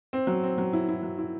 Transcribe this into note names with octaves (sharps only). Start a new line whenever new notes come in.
C4
F#3
C4
F#3
E4
E4
F#3
E4